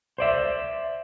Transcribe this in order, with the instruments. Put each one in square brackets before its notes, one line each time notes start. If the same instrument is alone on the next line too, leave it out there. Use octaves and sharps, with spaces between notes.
[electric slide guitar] C5 D5 E5